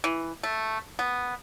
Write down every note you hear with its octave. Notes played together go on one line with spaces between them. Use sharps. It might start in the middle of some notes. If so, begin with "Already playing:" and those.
E3
A3
B3